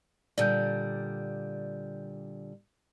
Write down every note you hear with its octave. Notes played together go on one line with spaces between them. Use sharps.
A#2 D3 G3 D5 G6